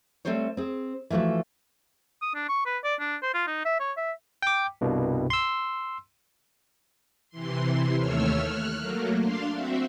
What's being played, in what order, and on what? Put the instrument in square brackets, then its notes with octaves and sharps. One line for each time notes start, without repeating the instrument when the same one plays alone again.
[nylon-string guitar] G3 A3 C4 G#4 C5 C#5
C4 G#4
E3 F3 A3 F#4 B4
[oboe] D#6
D4
C#6
B4
D5
D4
C5
F4
D#4
E5
C#5
E5
[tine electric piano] G5 D6
C2 G2 B2
C6 E6
[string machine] C3 E3 C6
D#2 A3 C#5 E6 F6
F6 F#6
F#3 A3 A#3
D4 F5 C6
C4 F#4 E5